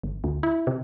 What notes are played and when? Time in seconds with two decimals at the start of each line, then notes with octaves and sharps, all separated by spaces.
0.03 G1
0.24 D2
0.43 E4
0.67 C3